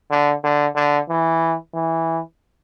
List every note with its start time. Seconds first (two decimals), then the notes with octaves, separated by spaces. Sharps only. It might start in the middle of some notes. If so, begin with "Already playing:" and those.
0.11 D3
0.44 D3
0.76 D3
1.09 E3
1.74 E3